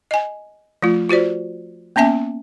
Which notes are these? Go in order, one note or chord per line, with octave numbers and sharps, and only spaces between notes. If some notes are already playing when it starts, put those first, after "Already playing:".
D#5 G#5
F3 A3 F4
F4 F#4 C5 D5
A#3 B3 C#4 E5 G#5